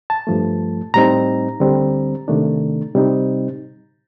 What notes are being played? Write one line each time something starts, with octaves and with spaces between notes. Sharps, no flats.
A5
G2 F3 A3
A2 G3 C4 D#4 A#5
D2 D3 G3 C4
C3 D#3 A3 D4
C3 G3 C4 D#4